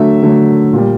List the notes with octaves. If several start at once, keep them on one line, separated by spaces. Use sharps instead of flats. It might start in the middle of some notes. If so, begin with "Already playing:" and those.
Already playing: D3 F#3 A3 E5
D3 F#3 A3
A#2 G3